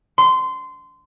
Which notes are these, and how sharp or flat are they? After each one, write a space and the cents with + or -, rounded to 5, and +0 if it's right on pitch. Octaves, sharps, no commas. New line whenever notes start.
C6 -20